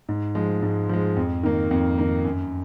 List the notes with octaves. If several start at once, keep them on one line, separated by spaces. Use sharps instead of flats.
G#2
F3 G#3
G#2
F3 G#3
F2
D#3 A#3
F2
D#3 A#3
F#2